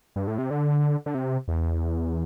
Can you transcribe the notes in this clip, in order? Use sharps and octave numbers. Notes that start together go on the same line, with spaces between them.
G2
A2
C3
D3
D3
C3
E2